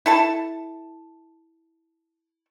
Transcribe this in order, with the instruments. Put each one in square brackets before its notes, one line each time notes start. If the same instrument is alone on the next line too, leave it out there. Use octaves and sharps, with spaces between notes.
[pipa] E4 A4 A5